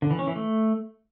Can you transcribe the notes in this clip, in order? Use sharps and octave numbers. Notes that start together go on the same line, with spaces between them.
D3
E3
C#4
E3
A3